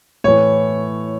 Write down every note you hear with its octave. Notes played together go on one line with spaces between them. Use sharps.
A2 E3 C#5